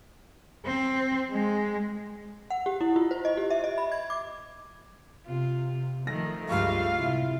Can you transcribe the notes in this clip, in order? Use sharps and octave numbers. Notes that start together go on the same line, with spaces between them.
C4
G#3
F#5
G4
E4
F4
C5
D#5
G4
E5
D#5
B5
G#6
D6
C3 F4
D#3 F3 A3 A#6
C#2 G2 F4 F5 C#6
A2 C3 E4